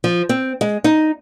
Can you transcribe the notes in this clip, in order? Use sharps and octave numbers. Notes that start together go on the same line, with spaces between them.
F3
C4
G#3
D#4